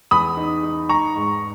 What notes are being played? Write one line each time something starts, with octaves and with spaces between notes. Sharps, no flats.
E2 B5 D#6
D#4
D#4
D#4 A#5 C#6
G#2